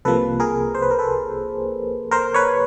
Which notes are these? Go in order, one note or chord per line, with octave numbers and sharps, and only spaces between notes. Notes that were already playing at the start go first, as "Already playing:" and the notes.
C2 C3 F3 A#3 A4 B4
G#4 A#4
C5
B4
A#4
A4 B4
A#4 C5
B4 C#5